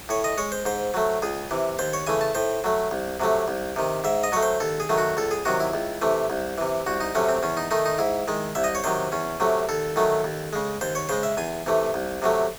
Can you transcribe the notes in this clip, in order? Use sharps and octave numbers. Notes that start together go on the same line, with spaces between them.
A2 C#5
D#5
G#3 C#5
C5
G#2 C5
F#3 A3
C#2 G#4
C3 E3
D#2 C5
C#5
C#3 E3 A3 G#5
A5
A2 C5
F#3 A3
C2
C3 F#3 A3
C2
C3 D#3
G#2 E5
D#5
F#3 A3 C#5
C5
D#2 A4
G#4
D#3 F#3 A3
F#4
C#2 A4
G#4
C3 D#3 F#3 F#4
E4
C#2
C3 E3 A3
C2
C3 E3
C2 F#4
D#4
C3 F#3 A3 C#4
C4
E2 C#4
D#4
D#3 A3 D#4
D#4
G#2 E4
D#3 G#3
C2 E5
D#5
C#5
C3 D#3 F#3 C5
E2 C#4
C3 F#3 A3
D#2 A4
D#3 F#3 A3
D#2
C#3 G#3
D#2 C5
C#5
C#3 G#3 C5
E5
E2 G#5
C3 E3 A3
C2
C3 F#3 A3